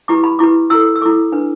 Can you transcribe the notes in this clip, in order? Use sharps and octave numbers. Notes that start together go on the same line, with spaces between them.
E4 G4 B4 D6
B5
E4 G4 B4 D6
E4 A4 E6
E6
E4 A4 D6
D4 B4